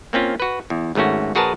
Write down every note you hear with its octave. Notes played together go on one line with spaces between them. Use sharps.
A#3 C4 C#4 F4
F#4 B4
E2
G#1 G#2 A3 C#4 F#4
A#1 F#4 G#4 A#4 B4 A5